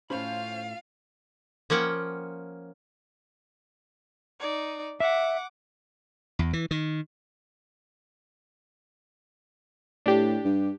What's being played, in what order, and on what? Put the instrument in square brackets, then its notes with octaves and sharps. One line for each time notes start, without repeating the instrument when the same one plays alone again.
[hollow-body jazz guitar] A2 B5 [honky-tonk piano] C#4 C5 [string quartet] F4 F5
[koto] F3 A#3 C#4 F#5 G5
[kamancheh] D#4 D5
[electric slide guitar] E5 [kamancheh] F#5 D6
[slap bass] E2
E3
D#3
[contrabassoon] A2 [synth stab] D4 G4
[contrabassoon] G2